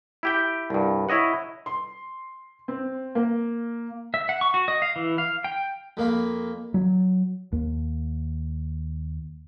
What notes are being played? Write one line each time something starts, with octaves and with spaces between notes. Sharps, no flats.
E4 G4 G5
C2 G2
E4 C#5 D#5 F#5
C6
C4
A#3
E5
F#5
C#6
F#4
D#5
F5
E3
F5
G5
F2 A#3 F5 B5
F#3
D#2